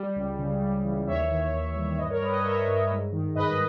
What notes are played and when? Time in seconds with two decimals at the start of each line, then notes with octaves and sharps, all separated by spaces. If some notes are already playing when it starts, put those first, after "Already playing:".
Already playing: G3
0.16 C#2
0.39 C#3
0.62 G3
0.84 E3
1.07 D#2 C#5 E5
1.31 D#3
1.53 D#2
1.76 G3
1.98 G2 B4 D#5
2.10 A#4 C#5
2.22 G3 B4 D#5
2.33 B4 D#5
2.44 G3 C#5 E5
2.67 G2
2.91 G#2
3.13 D#3
3.35 G#2 B4 D#5